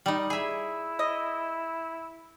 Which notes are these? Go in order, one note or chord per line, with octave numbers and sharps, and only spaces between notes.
G3 D#4
E4 G#4 E5
D#5